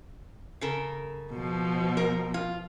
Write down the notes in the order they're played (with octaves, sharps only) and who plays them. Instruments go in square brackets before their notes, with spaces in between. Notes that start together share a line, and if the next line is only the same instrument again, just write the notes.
[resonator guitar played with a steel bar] C#3 A4 A#4
[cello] B2 F3
[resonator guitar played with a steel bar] A#4
F4